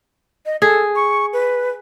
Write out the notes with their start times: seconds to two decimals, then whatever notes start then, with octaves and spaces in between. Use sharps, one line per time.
0.46 D#5
0.62 G#4 A4
0.96 C#6
1.33 B4